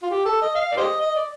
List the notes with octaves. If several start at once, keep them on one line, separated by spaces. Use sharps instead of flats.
F4
G4
A4
D#5
F5
D5
G4 C5 D#5
D#5
D5